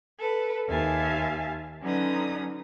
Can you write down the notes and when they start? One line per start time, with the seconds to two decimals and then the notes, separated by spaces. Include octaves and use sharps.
0.19 A4 B4
0.68 D#2 E5 F5 G#5 A5
1.83 D3 F#3 C#4 D#4 B4 D#6